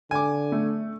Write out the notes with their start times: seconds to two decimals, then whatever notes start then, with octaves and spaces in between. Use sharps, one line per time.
0.11 D3 G#5 D6
0.52 A3